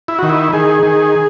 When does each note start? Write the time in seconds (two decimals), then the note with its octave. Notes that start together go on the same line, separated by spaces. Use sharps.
0.08 E4
0.18 D#3 F#4
0.29 E4
0.53 D#3 G#4
0.83 D#3